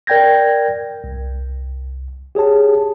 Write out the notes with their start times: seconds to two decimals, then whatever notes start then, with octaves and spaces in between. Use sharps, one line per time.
0.07 A#4 D5 G5 G6 G#6 A#6
1.04 C2
2.35 G4 G#4 C#5 A5